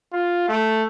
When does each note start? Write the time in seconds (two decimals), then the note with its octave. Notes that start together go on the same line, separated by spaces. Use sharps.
0.12 F4
0.48 A3